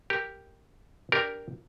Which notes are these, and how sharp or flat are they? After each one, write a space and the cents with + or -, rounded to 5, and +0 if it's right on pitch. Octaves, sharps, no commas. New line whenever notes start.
G4 +0 A#4 -10
D4 +0 G4 +0 A#4 +0